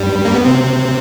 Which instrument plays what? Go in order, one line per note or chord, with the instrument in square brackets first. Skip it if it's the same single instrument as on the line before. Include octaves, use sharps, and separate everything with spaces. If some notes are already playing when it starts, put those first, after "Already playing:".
Already playing: [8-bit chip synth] G2 G3
A#3
B3
C3 C4